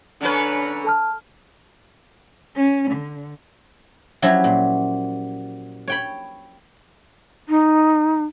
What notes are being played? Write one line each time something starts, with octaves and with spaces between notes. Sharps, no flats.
D3 C#4 D4 B4 A#5
A4 A5 F6
C#4
D3
F3 F#3 C#4 E4 G4
A#2
C#5 G5 B5
D#4